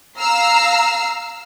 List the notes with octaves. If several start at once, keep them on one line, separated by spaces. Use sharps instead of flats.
F5 A#5 E6 F6 C7